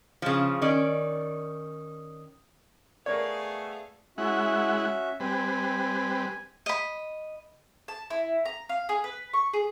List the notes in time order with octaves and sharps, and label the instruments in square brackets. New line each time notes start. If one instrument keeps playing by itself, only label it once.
[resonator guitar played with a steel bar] C#3 F3
D#3 C#4 D5
[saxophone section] A3 B3 [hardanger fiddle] G#4 F5 [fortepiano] A#4 C#5 [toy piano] D5
[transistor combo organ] G#3 E4 F#5 [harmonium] C#4 F#4 E5
[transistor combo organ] G3 C4 B4 [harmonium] G#5
[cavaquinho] D#5 B5
[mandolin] A5
E4
A#5
F5
G#4
B4
C#6
G#4